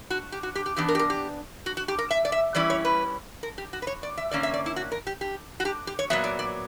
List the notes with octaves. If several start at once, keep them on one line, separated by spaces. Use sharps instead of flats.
F#4
G4
F#4
G4
G4
E3 B3 D4 G4
A#4
G4
A#4
G4
F#4
F#4
G4
A#4
E5
D5
E5
E3 G3 C#4 E4 D5
C#5
B4
A#4
G4
F#4
B4
C#5
D5
E5
D3 A#3 C#4 D5
E5
D5
E4
F#4
A#4
G4
G4
F#4
G4
G4
C#5
A#2 F#3 B3 E5
D5
D5